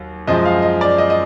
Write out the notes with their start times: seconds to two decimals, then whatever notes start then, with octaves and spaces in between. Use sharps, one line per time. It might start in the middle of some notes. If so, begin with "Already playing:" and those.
Already playing: D#2 F#3
0.27 F#2 F3 G#3 D#5
0.45 F5
0.62 D#5
0.81 D5
0.98 D#5
1.10 D#5